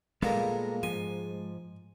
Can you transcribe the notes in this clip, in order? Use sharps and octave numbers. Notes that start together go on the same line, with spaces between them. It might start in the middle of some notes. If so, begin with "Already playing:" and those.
A#2 G3 G#3 A#3 B3 A4 A#4
G#2 F3 G#5